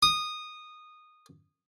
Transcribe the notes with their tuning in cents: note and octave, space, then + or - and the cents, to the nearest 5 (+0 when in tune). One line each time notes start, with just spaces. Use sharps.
D#6 -15